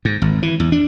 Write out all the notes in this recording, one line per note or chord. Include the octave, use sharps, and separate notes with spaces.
G#2
G#1
E3
E2
D4